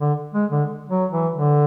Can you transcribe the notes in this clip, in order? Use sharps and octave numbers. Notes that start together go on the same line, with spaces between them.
D3
G#3
D3
F#3
E3
D3